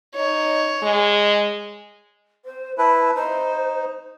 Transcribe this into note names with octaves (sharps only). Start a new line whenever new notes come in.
D#4 C#5
G#3
C5
E4 B4 A5
D#4 C5